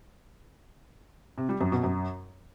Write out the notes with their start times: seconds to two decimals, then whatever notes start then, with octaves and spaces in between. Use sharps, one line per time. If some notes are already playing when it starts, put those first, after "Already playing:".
1.38 C3
1.49 G3
1.61 F#2
1.72 B2
1.84 F#2